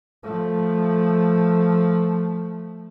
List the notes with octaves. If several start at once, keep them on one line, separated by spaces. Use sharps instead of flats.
F3 A3